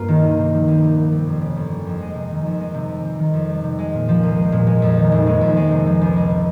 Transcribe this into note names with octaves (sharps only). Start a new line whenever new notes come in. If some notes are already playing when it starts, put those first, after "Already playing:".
Already playing: G2 A#3 F4
D#3
C2
C3
F3
C2
C2
C3
G3
F2
C#3
G1
G3
F2
G#3
C3
D#3
F2
G#3
C3
G3
C3
D#3
F2
G3
C3
G#3
A#2
F3
C2
G#3
A#2
G#3
F2
D#3
F1
G#3
F2
G#3
C3
F3
C#2
G#3
C3